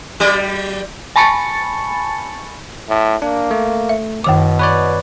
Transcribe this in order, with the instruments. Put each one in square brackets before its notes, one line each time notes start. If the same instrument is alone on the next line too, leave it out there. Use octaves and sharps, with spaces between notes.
[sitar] F#3 G3 D5
[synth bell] G#5 A5 B5 C#6 A6 C#7
[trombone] A2
[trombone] A#3 [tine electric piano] D4
[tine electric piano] A3
[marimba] E5
[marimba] F#2 D#3 D6 [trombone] B2
[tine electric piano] B4 C#5 D5